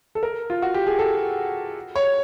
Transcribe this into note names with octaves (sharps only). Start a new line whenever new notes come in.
A4
A#4
F4
F#4
G4
G#4
A4
C#5